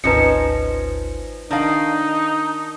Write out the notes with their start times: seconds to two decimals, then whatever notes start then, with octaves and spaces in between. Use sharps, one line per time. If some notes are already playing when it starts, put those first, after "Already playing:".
0.04 G#1 D2 F3 C#4 D#4 B4 C#7
1.51 D#3 D4 D#4 F5 A5